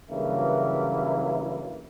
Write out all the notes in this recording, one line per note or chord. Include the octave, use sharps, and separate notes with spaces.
G2 C#3 E3 F#3 A#3 E4